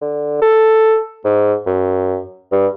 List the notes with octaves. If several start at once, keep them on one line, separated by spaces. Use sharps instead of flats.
D3
A4
G#2
F#2
G2